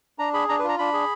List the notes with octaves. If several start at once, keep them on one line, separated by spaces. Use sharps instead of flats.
D4 A#5
G#4 B5
D4 A#5
B4
F4
A#5
D4 B5
G#4